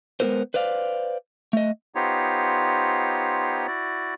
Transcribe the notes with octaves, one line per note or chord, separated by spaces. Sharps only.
G#3 B3 C#4 F#4 A#4 C5
B4 C5 D5 F5
A3 D#5
B3 D#4 F4 G4 C5 C#5
E4 F#4 D5